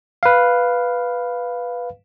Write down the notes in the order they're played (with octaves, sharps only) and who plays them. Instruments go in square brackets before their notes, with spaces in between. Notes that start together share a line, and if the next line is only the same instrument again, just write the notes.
[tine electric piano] B4 F5